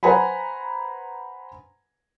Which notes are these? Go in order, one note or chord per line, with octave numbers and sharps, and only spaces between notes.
B4 C5 F#5 G#5 A#5 B5